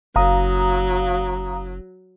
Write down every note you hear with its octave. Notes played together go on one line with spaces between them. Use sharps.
F#1 F#3 F5 A#5 D#6